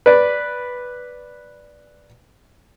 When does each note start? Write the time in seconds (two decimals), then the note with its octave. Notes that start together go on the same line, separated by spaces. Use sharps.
0.06 B4 D5